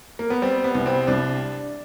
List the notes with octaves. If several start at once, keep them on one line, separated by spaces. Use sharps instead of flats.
A#3
B3
G3 C4
B3
C2
C4
C2 D4